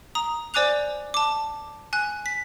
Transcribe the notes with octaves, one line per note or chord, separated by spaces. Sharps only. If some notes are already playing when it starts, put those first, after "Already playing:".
A#5 D#6
C5 D5 G#5 D6 F#6 F7
A5 D6
G#5 F#6
B6